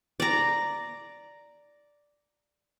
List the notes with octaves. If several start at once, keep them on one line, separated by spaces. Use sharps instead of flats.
D5 A#5